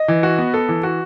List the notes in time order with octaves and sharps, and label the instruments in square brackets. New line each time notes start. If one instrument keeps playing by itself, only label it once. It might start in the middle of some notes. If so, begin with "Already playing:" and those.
Already playing: [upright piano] D#5
[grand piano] E3
F#4
B3
A4
E3
F#4